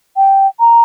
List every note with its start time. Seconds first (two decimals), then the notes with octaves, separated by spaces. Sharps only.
0.16 G5
0.59 A#5